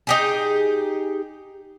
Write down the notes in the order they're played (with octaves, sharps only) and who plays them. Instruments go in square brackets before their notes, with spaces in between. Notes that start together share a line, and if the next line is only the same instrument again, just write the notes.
[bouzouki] D#4 G4 G#4